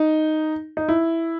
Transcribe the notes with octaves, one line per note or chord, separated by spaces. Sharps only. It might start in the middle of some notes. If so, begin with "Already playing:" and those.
Already playing: D#4
D#4
E4